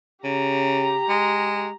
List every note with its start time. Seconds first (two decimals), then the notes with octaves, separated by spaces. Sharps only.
0.24 C#3 G4 A#5
1.09 G#3